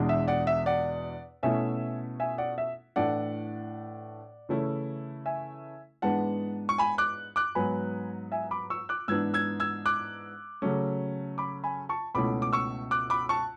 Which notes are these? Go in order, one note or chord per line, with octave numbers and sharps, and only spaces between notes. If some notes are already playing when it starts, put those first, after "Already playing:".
Already playing: E2 B2 G#3 D4
E5
D5 F#5
E5
D5 F#5
B2 A3 C#4 E4 E5 G#5
E5 G#5
D5 F#5
E5
A2 E3 A3 D4 D5 F#5
C#3 E3 A3 C#4 E4
E5 G#5
G#2 E3 G#3 B3 D4 F#5 A5
C#6
G#5 B5
D6 F#6
D6 F#6
G#2 F#3 B3 G#5 B5
E5 G#5
B5 D6
C#6 E6
D6 F#6
G#2 E3 B3 D4 E6 G#6
E6 G#6
E6 G#6
D6 F#6
C#3 F#3 A3 C#4
B5 D6
G#5 B5
A5 C#6
C#2 B2 A3 C#4 E4 B5 D6
D6
C#6 E6
D6 F#6
B5 D6
A5 C#6